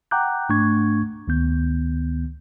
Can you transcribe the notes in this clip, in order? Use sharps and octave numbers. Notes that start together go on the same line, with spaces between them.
F#5 G5 A#5 D6 F#6 G6
G#2 A3 D4 C#6 G#6
D2 D#3 B3 G6